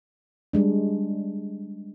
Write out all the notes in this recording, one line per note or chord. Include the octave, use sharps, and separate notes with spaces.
G3 G#3 D4